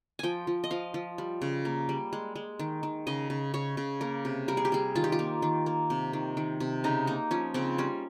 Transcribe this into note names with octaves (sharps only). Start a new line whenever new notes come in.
F3 G5 G#5
F3
D#5
F3 F5
F3
G3
C#3
A#3
G3
G#3
G#3
D#3
D#3
C#3 D#5
C#3
C#3 C#5
C#3
A#3 A#4
C3
G3 A#4
G#4
G4
G3 G#4
D#3 F4
G4
F4
A#3
D#3
A#3
C3
D#3
D#3
C3
C#3 D#4
A#3 D#4
F3 C#4
C#3 C4
G3 C#4